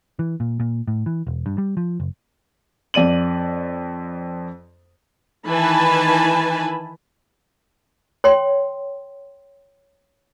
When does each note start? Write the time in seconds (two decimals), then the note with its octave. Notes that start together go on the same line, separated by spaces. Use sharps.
0.19 E3
0.40 A#2
0.60 A#2
0.88 A2
1.06 E3
1.27 E1
1.46 G2
1.58 G3
1.77 F3
2.00 F#1
2.94 F2 D5 D#7 F#7
5.47 D#3 E3 B4 G#5 A5 B5
8.24 C#5 G5 C6